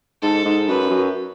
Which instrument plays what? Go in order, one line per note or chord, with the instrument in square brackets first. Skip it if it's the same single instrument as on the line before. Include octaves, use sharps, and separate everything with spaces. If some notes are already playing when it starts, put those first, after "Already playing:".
[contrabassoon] G#2 [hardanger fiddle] A4
[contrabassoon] G#2
[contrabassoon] F#2 [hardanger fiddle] B4
[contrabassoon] F#2